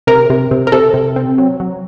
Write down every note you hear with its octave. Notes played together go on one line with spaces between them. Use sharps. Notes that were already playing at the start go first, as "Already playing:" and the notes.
C3 A#4
C3
C3
A#4
C3 A4
C3
C4
F#3
F#3